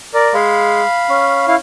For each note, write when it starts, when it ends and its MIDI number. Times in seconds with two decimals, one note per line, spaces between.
0.14 0.34 70
0.14 0.34 74
0.34 0.83 56
0.34 1.45 77
0.34 1.45 83
1.10 1.57 61
1.48 1.56 64
1.48 1.56 77